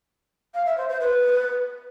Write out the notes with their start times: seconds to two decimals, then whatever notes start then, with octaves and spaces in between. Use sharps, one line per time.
0.54 F5
0.66 E5
0.77 C5
0.89 C5
1.00 B4